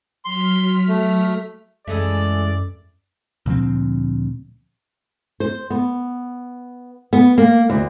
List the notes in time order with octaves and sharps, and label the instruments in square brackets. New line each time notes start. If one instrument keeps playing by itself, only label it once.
[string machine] F#3 F6 B6 [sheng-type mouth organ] C6
[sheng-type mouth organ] A3
[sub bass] F#2 [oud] E3 G#3 A3 [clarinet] A4 [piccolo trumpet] D5
[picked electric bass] D2 A#2 F3 C4
[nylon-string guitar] C5
B3
B3
A#3
D2